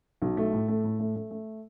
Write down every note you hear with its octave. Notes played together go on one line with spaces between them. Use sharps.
B1
A3
A2
A3
A2
A3
A3
A3